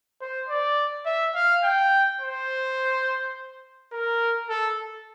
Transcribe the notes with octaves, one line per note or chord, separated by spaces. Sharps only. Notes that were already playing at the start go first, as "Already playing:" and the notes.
C5
D5
E5
F5
G5
C5
A#4
A4